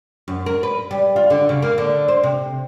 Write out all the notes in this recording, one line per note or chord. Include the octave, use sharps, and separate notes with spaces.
F#2
A#4
B4
G3
F4
D3
C#3
A#3
D3
C5
C3